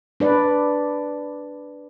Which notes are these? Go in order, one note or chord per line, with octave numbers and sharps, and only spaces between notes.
D4 B4 D5